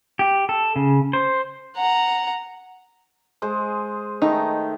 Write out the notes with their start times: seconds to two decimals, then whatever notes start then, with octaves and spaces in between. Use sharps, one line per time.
0.19 G4
0.49 A4
0.76 C#3
1.13 C5
1.77 F#5 A#5
3.42 G#3 G#4 C5
4.22 D#3 A3 D#4 E5